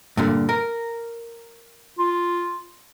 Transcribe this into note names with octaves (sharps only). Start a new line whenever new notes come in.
G2 A#2 D3
A#4
F4